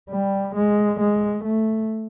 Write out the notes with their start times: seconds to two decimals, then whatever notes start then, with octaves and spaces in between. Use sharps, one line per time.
0.10 G3
0.55 G#3
1.00 G#3
1.44 A3